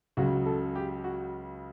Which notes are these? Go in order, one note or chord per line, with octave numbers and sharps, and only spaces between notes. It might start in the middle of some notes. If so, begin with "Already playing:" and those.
C#2 C#3 F#3 F#4
A4
G4
F#4